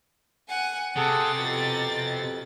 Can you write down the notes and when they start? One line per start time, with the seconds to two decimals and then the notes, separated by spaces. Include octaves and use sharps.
0.49 F#5 G#5
0.96 C3 G#4 A4 F#5 A6
1.37 F2 B2